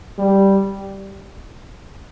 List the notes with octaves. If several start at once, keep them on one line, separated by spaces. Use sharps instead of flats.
G3